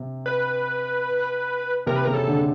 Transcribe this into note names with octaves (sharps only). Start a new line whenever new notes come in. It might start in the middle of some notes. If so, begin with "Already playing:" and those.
Already playing: C3
B4
C3 A#4
B4
C#3 A#4
A4
D3